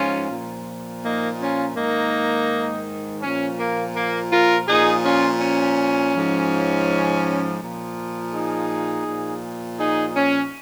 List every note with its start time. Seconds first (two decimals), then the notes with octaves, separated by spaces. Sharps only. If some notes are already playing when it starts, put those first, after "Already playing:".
Already playing: G#2 F3 C#4 F4
0.30 A#2 F3
1.03 A#3 D#4
1.40 C#4 F4
1.76 G#2 D#3 A#3 D#4
3.22 A#2 F3 C#4
3.58 A#3
3.95 A#3
4.32 F4 A#4
4.67 A#2 F3 D#4 G#4
5.04 C#4 F4
5.41 C#4
6.14 G#2 F3
7.60 A#2 F3
8.32 D#4 G#4
9.06 A#2 F3
9.78 D#4 G#4
10.15 C#4